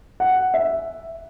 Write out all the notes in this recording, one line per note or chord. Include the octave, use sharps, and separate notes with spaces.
F#5
E5